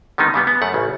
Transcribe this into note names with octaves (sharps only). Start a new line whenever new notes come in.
D3 D#3 G3 B3 D#4
C#3 G3 B3
B3
F#2 A3 F#5
A1 C#3